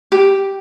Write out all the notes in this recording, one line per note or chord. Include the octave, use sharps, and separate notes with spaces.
G4